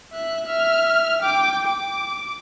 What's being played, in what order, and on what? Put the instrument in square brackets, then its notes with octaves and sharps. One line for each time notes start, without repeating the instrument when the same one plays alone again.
[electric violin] E5 F#6
E5 F6
G5 D6
D6